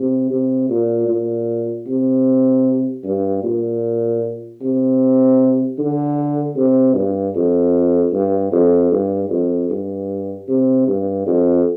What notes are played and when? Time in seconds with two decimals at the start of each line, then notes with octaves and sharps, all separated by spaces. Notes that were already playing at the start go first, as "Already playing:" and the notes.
Already playing: C3
0.30 C3
0.69 A#2
1.08 A#2
1.87 C3
3.04 G2
3.44 A#2
4.61 C3
5.79 D3
6.56 C3
6.95 G2
7.35 F2
8.13 G2
8.52 F2
8.92 G2
9.30 F2
9.70 G2
10.48 C3
10.88 G2
11.26 F2